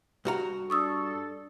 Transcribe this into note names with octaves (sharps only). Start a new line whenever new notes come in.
G2 F#4 A#5
D4 A4 C#6 D#6 E6